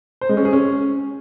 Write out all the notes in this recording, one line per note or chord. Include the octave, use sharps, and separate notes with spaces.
C5
G#3
C#4
G#4
C#4